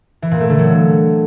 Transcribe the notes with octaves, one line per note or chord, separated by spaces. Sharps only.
E3
A#2
A3
D3
F#3